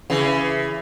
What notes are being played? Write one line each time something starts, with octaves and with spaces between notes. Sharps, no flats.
C#3 E3